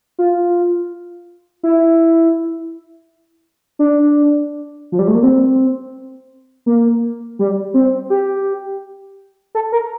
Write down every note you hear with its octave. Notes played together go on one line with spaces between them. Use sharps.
F4
E4
D4
F3
G3
A3
A#3
C4
A#3
G3
C4
G4
A4
A#4